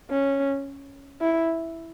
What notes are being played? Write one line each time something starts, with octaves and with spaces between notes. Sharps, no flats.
C#4
E4